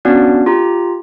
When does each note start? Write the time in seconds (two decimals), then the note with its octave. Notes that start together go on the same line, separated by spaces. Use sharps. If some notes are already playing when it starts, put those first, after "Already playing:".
0.05 B3 C#4 D4 F#4 D5 F5
0.46 F4 G4 A#5